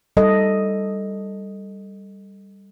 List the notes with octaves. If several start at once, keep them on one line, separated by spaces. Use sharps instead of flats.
G3 A4 D#5